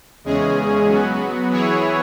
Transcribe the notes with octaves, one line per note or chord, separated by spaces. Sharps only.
E2 C#3 G#3 C#4 G#4
F#3 B3 F#4
E3 B3 E4 G#4 C#5